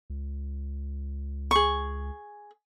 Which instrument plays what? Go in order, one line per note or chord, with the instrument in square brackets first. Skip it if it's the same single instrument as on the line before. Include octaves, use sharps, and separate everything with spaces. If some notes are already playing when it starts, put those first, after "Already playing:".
[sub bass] C#2
[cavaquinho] G#4 C#6